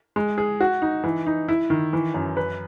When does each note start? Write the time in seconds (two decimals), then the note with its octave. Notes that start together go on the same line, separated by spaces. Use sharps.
0.16 G#3
0.38 G#4
0.61 F#4
0.82 D#4
1.04 E3
1.26 D#4
1.48 E4
1.70 D#3
1.93 E3
2.14 F#2
2.37 B4